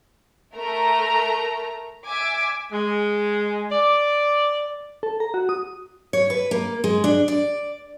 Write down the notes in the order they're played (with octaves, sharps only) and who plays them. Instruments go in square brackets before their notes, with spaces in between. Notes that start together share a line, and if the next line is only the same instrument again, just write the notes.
[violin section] A3 A#4 A#5
E5 G#5 D6
[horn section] G#3
D5
[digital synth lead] A4
A#5
F#4
D#6
[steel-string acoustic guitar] C#5
B4
A#3
G#3
D4
D5